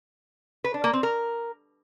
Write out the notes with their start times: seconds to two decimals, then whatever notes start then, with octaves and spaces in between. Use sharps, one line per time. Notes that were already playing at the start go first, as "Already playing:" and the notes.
0.64 B4
0.74 D4
0.84 A#3
0.93 C4
1.03 A#4